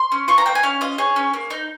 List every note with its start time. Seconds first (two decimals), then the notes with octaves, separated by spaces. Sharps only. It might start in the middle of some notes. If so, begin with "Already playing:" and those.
Already playing: C6
0.12 C#4
0.28 F4 C#6
0.38 A#5
0.46 A#3 G5
0.55 G#5
0.63 C#4 F5
0.81 F4 D#5
0.98 G#4 C#5
1.16 C#4
1.34 A#3
1.50 D#4